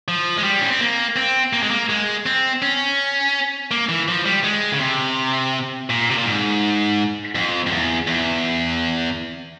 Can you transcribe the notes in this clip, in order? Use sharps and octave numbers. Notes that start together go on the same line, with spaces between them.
F3
G#3
G3
C#4
C4
A#3
C4
A#3
G#3
A#3
G#3
C4
C#4
A#3
E3
F3
G3
G#3
C#3
C3
A#2
C3
A#2
G#2
F2
F2
E2
E2